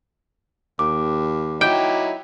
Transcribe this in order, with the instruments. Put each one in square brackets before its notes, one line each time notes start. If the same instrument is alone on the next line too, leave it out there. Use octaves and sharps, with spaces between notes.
[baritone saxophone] D#2 [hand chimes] D6
[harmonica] F#3 D#4 E4 [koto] G5 [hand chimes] D6